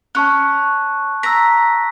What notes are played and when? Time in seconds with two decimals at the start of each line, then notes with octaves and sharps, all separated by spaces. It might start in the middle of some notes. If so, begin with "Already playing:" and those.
0.15 C#4 A5 C#6 F#6
1.23 A#5 E6 B6